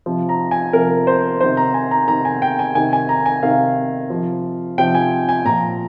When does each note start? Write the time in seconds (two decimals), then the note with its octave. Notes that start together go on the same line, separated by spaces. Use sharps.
0.06 C3 F3
0.29 A#5
0.51 G#5
0.73 C3 F3 A#4
1.07 C5
1.40 C3 D#3 C5
1.57 A#5
1.74 G#5
1.91 A#5
2.08 C3 D#3 A#5
2.25 G#5
2.42 G5
2.59 G#5
2.75 C3 D#3 G#5
2.93 G#5
3.09 A#5
3.26 G#5
3.43 C3 D#3 F5
4.10 C3 F3
4.78 C3 F3 G5
4.95 G#5
5.29 G#5
5.45 A#2 F3 A#5